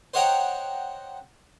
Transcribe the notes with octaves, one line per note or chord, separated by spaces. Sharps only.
C5 C#5 D#5 F#5 G5 A#5